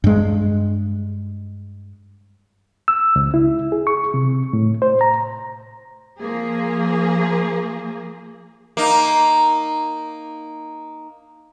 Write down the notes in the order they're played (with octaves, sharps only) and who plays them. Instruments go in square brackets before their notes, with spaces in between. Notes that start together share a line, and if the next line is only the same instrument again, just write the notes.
[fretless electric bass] G2 G#3
[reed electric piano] E6
C#2
E4
G#4
C#6
C3
A2
C5
A#5
[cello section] F3 A#3 G#4
[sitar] A#3 D#4